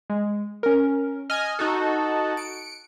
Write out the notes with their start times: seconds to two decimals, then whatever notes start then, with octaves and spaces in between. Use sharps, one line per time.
0.10 G#3
0.63 C#4 A#4
1.30 D#5 G#5 F6
1.59 D#4 F#4 A4 F#6
2.37 C#7 D7